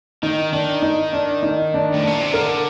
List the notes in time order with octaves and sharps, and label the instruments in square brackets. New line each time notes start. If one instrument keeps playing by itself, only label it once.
[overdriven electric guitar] D#3 [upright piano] D#4
[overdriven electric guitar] D#3 [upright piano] D4
[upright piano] D#4
D4
D#4
D4
[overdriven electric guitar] A2
[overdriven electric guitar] A#2 [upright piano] D4
[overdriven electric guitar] C3
[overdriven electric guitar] D3 [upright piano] A#4